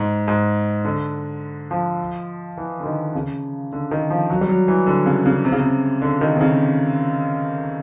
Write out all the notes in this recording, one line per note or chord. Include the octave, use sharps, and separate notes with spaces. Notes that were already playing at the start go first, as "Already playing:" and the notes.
Already playing: G#2
G#2
D3
F3
E3
D3
D#3
C#3
D3
D#3
F3
F#3
G3
F#3
E3
D3
C#3
C#3
C3
C#3
C3
D3
D#3
C3
C#3